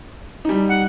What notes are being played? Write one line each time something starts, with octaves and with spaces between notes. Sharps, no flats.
G3 D#4
F#5